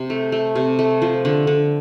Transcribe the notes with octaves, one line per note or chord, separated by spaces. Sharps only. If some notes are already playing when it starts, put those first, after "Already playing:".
Already playing: C3
A3
A3
C3
A3
F3
D3
D3